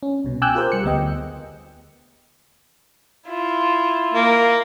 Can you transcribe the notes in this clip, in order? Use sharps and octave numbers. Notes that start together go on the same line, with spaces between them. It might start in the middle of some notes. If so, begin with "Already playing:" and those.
C#4
C2 B2
G5 G#5 D6 E6 F#6 G6
F4 G4 G#4 A#4 C5
G3 C#7
D2 B3 D#5 G5
E4 F4
A#3